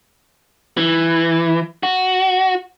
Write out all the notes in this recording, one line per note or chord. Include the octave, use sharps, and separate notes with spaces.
E3
F#4